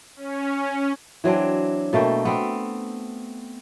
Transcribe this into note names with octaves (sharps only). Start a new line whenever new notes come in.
C#4
E3 F#3 C4 D4
B2 A3 A#3 G5
B3 C4